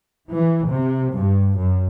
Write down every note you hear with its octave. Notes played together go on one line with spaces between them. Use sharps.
E3
C3
G2
F#2